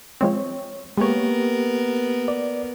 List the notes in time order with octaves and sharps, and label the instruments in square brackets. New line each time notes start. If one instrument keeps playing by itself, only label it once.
[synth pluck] F3 G#3 C4 [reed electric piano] C#5
[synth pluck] G#3 C#5 [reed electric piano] A#3 G4 [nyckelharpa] B3 A#4
[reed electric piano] D5